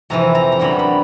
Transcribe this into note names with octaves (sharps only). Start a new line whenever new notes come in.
F2 C3 E3 A#5
A#5
A#5
F#2 D3 G3 B3 B5
B5